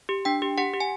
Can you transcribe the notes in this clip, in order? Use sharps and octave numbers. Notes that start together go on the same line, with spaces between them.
G4
D4 G5
G4
G4 F#5
G4
G#5